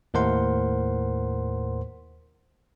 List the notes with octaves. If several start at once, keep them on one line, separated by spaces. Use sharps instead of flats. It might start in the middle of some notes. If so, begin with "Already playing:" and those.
D#2 A2 A#4 C5 F#5 C6